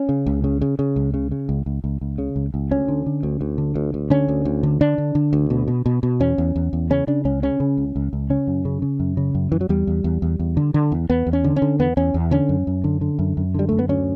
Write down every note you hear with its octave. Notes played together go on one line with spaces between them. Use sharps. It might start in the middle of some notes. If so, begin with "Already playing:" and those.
Already playing: C#4
C#3
C#2
C#3
C#3
C#3
C#2
C#3
C#3
C#2
C#2
C#2
C#2
C#3
C#2
C#2
D2 C#4
D3
D3
D2
D2
D3
D2
D2
D3 C#4
D2
D2
D3
D3 D4
D3
D3
D2
B2
B2
B2
B2
E2 C#4
E2
E2
E2
C#3 C#4
C#3 D4
C#2 C#4
C#3 C#4
C#3
C#2
C#2
C#2
C#3 C#4
F#2
C#3
C#3
F#2
C#3
F#2
F#2 E3
F#3
E2 G3
E2
E2
E2
E2
D3
D3
E2
E2 B3
E2
C#4
D3
C#4
D3
E2 B3
E2 C#4
E2
D3 C#4
F#2
F#2
D3
D3
F#2
F#2
D3 G3
F#2 A3
B3
D2 C#4